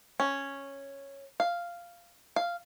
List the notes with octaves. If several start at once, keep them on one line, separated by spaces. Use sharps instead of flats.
C#4
F5
F5